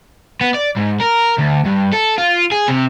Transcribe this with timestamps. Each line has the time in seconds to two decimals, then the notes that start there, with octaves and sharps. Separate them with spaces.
0.41 B3
0.54 D5
0.77 G#2
1.01 A#4
1.39 D2
1.66 G2
1.93 A4
2.18 F4
2.52 G#4
2.68 C3